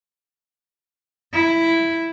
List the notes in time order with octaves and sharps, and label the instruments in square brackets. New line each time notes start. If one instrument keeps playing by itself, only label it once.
[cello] E4